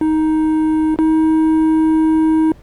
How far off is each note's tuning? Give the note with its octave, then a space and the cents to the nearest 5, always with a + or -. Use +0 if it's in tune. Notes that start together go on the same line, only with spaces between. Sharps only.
D#4 +10
D#4 +30